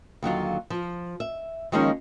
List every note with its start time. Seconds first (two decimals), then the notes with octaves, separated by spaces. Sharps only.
0.23 D#2 D3 F#3 F4
0.70 F3
1.20 E5
1.72 D#3 F3 G#3 A#3 C#4 D#4